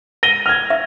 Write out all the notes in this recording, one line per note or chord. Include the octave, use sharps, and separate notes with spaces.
A#6 D#7 G7
F6 G#6
E5